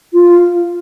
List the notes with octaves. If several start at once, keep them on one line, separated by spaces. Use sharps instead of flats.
F4